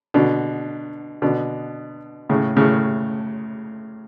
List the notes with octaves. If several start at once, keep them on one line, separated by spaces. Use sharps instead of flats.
B2 D3
B2 D3
A2 C#3
A2 C#3